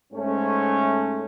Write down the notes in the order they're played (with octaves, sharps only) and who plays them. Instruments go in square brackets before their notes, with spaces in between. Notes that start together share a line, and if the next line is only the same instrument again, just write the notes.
[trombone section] G#2 A3 C#4